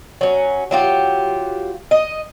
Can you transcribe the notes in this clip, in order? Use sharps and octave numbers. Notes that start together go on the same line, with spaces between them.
F#3 C#4
F#3 F4 G4
D#5